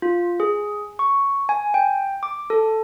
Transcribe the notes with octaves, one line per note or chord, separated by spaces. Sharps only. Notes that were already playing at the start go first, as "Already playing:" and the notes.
F4
G#4
C#6
G#5
G5
D6
A4